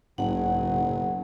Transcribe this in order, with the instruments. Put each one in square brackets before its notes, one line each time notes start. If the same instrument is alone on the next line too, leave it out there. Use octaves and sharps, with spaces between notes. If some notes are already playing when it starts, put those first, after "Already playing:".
[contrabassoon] F#1 [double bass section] B1 C#3 F#3 [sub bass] G#2 [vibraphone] F#5